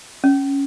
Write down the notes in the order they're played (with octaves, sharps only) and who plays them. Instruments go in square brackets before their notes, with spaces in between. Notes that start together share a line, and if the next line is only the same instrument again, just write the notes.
[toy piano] C#4